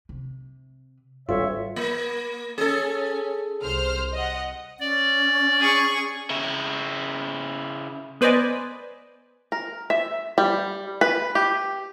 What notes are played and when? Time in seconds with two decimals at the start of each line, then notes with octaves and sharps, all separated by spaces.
0.09 C3
1.29 G#1 D2 G3 C4 F4 C#5 E5
1.76 A#3
2.58 C#4 G#4 A4
3.61 C2 C5 F6
4.13 D#5 F#5
4.80 C#4 D5
5.60 G#4 C#6
6.30 C#3 E4
8.21 B3 B4 C5 D5 D#5 G#5
9.52 A#4
9.90 E5
10.38 G3
11.01 B4
11.35 G4